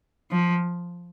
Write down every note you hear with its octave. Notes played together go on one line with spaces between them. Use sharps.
F3